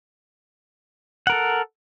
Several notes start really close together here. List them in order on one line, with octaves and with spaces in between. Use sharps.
F#5 A#4 A4